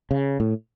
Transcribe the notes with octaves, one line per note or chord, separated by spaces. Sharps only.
C#3
A2